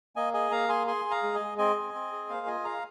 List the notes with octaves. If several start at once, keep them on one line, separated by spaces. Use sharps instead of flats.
A#3 D#5 G#5
G#4 D#5 G#5
A#3 F5 A#5
G#4 G#5 C6
G#4 G#5 C6
G#4
F5 A#5
G#3
D#5 G#5
G#3
C4 D#5 G#5
C4
C4
G#4
A#3 C5 F5
F4 D#5 G#5
G#4 F5 A#5